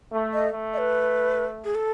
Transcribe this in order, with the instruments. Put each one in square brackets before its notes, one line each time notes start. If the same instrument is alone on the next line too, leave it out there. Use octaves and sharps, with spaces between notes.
[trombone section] A3
[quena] D#5
[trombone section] A3
[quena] D#5
B4
G#4
A4